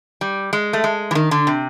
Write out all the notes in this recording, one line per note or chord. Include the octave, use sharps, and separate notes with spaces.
G3
G#3
A3
G#3
E3
D#3
D3
C3